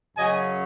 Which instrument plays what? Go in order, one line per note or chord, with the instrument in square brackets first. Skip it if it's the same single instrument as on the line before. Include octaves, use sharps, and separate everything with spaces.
[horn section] F#2 C#3 F#3 D#5 G#5